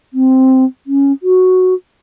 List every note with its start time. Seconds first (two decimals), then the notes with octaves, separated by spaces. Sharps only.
0.13 C4
0.86 C#4
1.23 F#4